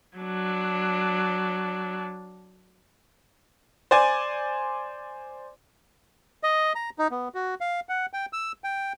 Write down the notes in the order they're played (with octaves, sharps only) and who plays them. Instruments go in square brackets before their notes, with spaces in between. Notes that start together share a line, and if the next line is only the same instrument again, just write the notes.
[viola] F#3 D4
[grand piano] C5 D5 G#5
[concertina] D#5
A#5
D#4
B3
F#4
F5
F#5
G5
E6
G5